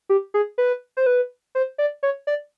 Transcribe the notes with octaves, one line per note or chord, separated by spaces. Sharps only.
G4
G#4
B4
C5
B4
C5
D5
C#5
D5